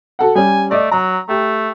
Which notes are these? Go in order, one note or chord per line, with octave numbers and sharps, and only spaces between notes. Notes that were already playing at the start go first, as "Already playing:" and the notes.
F#4 A4 F#5
G3 C#4 G#5
A3 D5 D#5
F#3 A#5
A3 G4